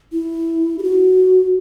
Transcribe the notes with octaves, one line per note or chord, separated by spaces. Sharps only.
E4
G4
F#4